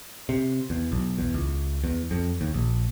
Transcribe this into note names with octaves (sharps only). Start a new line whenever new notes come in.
C3
E2
B1
E2
C#2
E2
F2
D#2
A#1